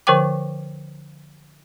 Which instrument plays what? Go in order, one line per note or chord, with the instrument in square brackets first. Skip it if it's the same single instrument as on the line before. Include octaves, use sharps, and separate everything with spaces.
[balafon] D3 F3 A#4 C5 G5 D6